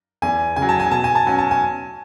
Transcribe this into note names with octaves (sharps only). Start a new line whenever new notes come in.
E2 G#5
C#3 G#5
F#3
A5
G#5
B2 A5
G#5
A5
F#3 C#4 G#5
A5
G#5